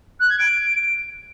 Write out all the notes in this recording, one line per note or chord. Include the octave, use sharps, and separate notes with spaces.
F#6
G#6
D7